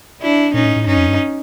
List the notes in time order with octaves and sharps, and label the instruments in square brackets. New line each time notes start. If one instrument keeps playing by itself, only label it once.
[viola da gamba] D4 E4
[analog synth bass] A#2 [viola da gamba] C#4 D#4
[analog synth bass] A2
A2
[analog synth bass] G2 [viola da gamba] C#4 D#4
[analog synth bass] F2
G2